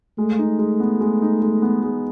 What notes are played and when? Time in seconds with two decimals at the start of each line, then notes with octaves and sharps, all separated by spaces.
0.18 G#3 A3
0.39 D#4
0.59 G#3
0.80 B3
1.01 G#3
1.22 D#4
1.42 G#3
1.62 B3
1.83 G#3